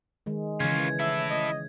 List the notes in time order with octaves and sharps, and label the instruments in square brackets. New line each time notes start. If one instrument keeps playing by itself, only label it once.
[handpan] D#3 G#3
[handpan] C#3 E3 [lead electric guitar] C#4 F4 [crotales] G#6
[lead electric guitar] E4 A4 [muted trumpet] E5
[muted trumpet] D#5